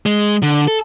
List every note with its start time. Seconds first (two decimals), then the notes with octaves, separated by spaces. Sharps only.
0.06 G#3
0.42 D3
0.68 A4